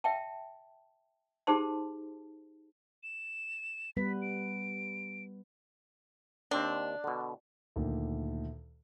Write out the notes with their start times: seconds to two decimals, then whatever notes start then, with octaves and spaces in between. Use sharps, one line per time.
0.04 E5 G5 A5
1.47 D#4 G4 G#4 C5 A5 C6
3.03 E7
3.97 G3 B3 B4 B6
4.22 D7
6.51 D#2 C4 D4 A5
7.04 B2 D3
7.76 D2 A#2 D#3